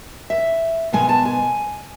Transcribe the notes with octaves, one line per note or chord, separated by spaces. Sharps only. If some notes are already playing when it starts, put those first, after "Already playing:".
E5
B2 G#3 B3 G#5
A5
G#5